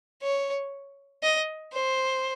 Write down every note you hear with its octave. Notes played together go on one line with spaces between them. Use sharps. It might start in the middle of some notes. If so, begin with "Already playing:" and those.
C#5
D#5
C5